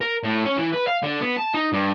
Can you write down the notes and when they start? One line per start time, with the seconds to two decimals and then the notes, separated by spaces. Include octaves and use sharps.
0.01 A#4
0.24 A2
0.45 C#4
0.57 E3
0.73 B4
0.88 F5
1.03 D3
1.21 B3
1.37 A5
1.54 D#4
1.73 G2